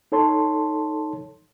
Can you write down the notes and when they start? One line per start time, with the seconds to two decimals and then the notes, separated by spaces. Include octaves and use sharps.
0.12 D#4 A4 C#5 A5 C6